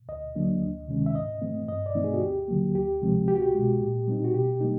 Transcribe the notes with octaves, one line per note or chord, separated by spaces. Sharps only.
D2 D#5
D3 F#3 A#3 D4
D2
C3 D#3 G#3 C#4
E5
G#2 D#5
E3 A3 C4
G2 D#5
D5
E3 A3 C4 D#4
G#4
F#4
D2 G4
D3 F#3 A#3
D2 G4
C3 F3 G#3 C4
C2 G4
F#4
G4
B2 G#3
A#2
G3 C4 D#4
F#4
B2 G4
G3 A#3 D#4